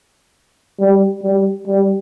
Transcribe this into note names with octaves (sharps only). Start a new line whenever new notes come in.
G3
G3
G3